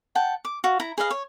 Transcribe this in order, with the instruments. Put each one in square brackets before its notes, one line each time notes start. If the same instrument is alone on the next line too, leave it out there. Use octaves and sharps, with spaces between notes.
[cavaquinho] F#5 G5 A5
D6
F#4 F5
E4 A#5
G#4 B4 D#5 F5
C#5